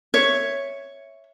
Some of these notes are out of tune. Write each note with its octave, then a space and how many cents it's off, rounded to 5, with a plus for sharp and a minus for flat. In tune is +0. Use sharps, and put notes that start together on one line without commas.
C#5 +0 E5 +0